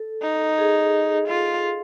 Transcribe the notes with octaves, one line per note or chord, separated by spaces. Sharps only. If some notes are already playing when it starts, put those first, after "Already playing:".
Already playing: A4
D#4
G#4
F4